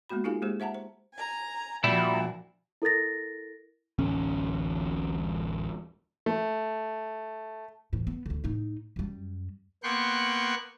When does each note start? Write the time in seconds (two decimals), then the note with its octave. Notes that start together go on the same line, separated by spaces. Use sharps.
0.09 G#3 A#3 B3 F#4 B5
0.24 D#4 F4 G4 A4 F5 G#5
0.42 G#3 A#3 G4 G#4 C5
0.60 C5 E5 F#5 A5 A#5
0.74 C5
1.14 G#5 A#5
1.84 A#2 F3 G3 D4 E4 F#4
2.82 E4 A4 A#4 A6 A#6
3.98 D1 A1 C#4
6.26 A3
7.93 E2 A2
8.07 B3
8.26 D2 D3
8.44 A2 D#4
8.96 F#2 G3
9.83 A#3 B3 G5 C6 C#6 F#6